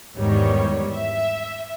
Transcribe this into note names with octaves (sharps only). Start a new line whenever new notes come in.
E2 G#2 D#3 G3 C#5
E5